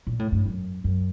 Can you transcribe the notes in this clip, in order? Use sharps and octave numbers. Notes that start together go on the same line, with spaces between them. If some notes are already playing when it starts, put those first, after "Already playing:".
A#2
A2
G2
F#2
F#2